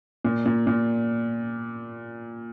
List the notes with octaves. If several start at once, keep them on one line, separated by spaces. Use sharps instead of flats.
A#2
A#2
A#2